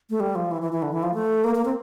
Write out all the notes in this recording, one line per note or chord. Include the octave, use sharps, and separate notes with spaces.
A3
G3
F3
E3
E3
E3
D3
E3
F3
A3
A#3
A#3
C4